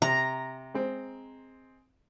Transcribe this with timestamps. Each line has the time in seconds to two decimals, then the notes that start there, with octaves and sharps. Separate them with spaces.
0.02 C3 A#5
0.74 G#3 C4